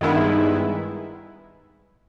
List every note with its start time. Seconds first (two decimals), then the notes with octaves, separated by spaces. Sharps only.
0.01 G2 D#3 G#3 B3 E4